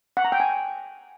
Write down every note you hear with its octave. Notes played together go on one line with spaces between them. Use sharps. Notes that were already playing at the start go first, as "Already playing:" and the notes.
F#5
A#5
G5
G#5